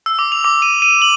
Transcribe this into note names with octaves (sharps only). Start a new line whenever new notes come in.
E6
D6
F7
D6
D#7
D#7
F#7